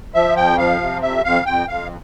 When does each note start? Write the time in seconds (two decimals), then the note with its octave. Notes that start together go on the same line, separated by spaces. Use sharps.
0.14 F3 E5
0.36 F2 G5
0.58 F3 F5
0.80 C3
1.02 F2 E5
1.24 F2 F5
1.46 F2 G5
1.68 F2 F5